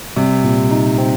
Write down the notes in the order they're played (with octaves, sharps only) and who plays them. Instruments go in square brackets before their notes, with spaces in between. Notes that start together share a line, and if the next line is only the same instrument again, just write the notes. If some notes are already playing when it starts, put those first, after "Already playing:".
[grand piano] C3 [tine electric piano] G3
[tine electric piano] A#2
D#4
C4